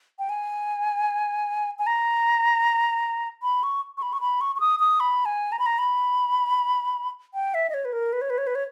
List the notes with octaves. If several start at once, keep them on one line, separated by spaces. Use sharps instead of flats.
G5
G#5
G#5
A#5
B5
C#6
C#6
B5
C#6
B5
C#6
C#6
D#6
D#6
B5
G#5
A#5
B5
A#5
B5
G5
E5
D#5
C#5
B4
A#4
B4
C#5
B4
C#5
B4
C#5